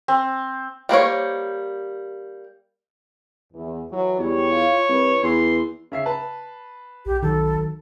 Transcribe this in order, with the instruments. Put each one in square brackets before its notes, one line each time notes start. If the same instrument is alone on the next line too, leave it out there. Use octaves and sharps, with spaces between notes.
[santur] C4
[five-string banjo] G3 A#3 C5 C#5
[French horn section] E2
E3 F#3
[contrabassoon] E2 [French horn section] G3 [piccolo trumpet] C#5
[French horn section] F4
[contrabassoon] C2 [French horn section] B4
[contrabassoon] E2 [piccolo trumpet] C6
[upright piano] C#3 E5 C7
B4 A5
[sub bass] B1 [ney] G4
[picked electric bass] D#3 F#3 [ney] A4